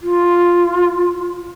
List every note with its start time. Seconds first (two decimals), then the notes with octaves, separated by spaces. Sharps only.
0.01 F4